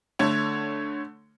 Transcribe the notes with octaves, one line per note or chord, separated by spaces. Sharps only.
D3 A3 C#5